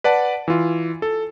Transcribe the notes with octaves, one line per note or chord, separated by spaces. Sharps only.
B4 D5 F#5 A5
E3 F4
A4